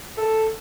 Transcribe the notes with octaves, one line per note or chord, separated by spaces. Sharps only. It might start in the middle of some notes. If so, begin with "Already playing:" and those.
A4